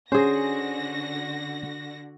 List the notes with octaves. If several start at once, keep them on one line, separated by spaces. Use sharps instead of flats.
D3 C#4 F#4 G#4 C5 A#6